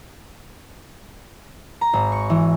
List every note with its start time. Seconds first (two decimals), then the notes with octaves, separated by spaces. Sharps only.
1.81 A#5
1.93 G#1
2.12 C#6
2.30 E3